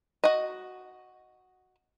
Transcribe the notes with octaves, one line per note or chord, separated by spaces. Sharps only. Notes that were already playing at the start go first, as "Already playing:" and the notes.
F#4 D#5